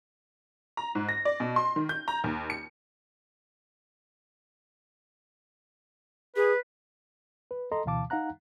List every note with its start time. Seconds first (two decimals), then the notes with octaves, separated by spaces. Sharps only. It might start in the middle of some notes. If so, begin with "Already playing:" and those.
0.77 A#5
0.95 G#2
1.09 A#6
1.25 D5
1.40 B2
1.56 C6
1.76 D#3
1.89 G6
2.08 A#5
2.24 D#2
2.50 C#7
6.36 G#4 B4
7.51 B4
7.72 A4 D#5 A#5 C6
7.85 D2 B2 E3 F5 A5 D6
8.10 D#4 F5 F#5 A#5 F#6